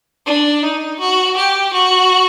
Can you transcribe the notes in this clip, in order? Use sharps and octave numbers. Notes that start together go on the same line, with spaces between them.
D4
D#4
F#4
G4
F#4